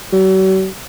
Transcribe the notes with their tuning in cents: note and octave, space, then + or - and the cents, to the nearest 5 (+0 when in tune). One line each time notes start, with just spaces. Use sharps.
F#3 +45